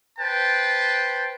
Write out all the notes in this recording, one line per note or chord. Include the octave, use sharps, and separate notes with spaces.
B4 C5 G5 A5